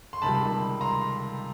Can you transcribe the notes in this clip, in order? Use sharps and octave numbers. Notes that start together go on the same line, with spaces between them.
C6
C#2 C3 D#3 G3 A5 B5
A#5 C6